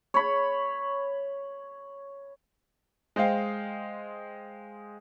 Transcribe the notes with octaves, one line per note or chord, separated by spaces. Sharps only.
C#5 B5
G#3 C5 D#5 F5 G5